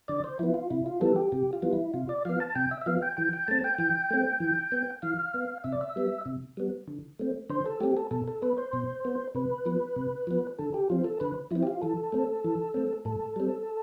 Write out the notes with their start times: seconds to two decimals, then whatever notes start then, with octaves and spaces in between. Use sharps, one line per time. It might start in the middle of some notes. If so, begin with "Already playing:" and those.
0.08 D3 D5
0.24 C5
0.39 F3 B3 E4
0.54 F4
0.70 C3 E4
0.86 F4
1.01 E3 G3 B3 A4
1.16 G4
1.32 C3 G4
1.53 F4
1.62 E3 G3 B3
1.73 E4
1.94 C3 F4
2.09 D5
2.25 F3 B3 F5
2.40 A5
2.55 C3 G5
2.71 E5
2.81 E5
2.86 F3 B3 F5
3.02 G5
3.17 E3 G5
3.33 G5
3.48 A3 C4 A5
3.64 G5
3.78 E3 G5
4.10 A3 C4
4.40 E3
4.72 B3
5.02 E3 F5
5.34 B3
5.64 C3 E5
5.72 D5
5.81 E5
5.96 G3 B3
6.26 C3
6.57 G3 B3
6.88 D3
7.19 A3 C4
7.50 D3 C5
7.66 A4
7.80 A3 C4 G4
7.97 A4
8.11 B2 A4
8.27 A4
8.42 B3 B4
8.58 C5
8.73 B2
9.05 B3
9.35 C3 B4
9.65 F3 B3
9.96 C3
10.27 F3 B3
10.59 D3 A4
10.74 G4
10.90 F3 C4 F4
11.04 A4
11.20 D3 B4
11.51 F3 C4 E4
11.63 G4
11.67 F4
11.81 E3 A4
12.12 A3 C4
12.44 E3
12.74 A3 C4
13.05 A2 A4
13.36 G3 C4